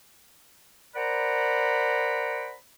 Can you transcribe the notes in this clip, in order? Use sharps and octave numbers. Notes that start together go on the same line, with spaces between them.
A#4 C5 D5 F#5 A#5 B5